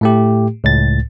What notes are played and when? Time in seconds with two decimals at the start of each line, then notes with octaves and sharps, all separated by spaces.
0.01 A2 A3 G4
0.64 C#2 A2 A6